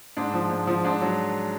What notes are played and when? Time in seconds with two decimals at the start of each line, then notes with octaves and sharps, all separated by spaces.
0.17 G#2 D4
0.34 F3
0.50 G#2
0.67 F3
0.84 G#2 D4
1.02 F#3